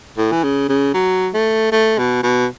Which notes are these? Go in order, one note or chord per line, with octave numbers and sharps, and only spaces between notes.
A2
E3
C#3
C#3
F#3
A3
A3
B2
B2